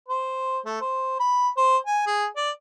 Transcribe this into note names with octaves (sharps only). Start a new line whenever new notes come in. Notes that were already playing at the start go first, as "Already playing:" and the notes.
C5
A3
C5
B5
C5
G#5
G#4
D5